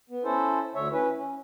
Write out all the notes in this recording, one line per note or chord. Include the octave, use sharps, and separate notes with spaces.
B3
C#4 E4 A4 C5
D2 D3 C#5 E5
C#4 E4 B4
C#4